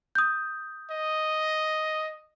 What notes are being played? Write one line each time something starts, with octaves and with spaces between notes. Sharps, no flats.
D#6 G6
D#5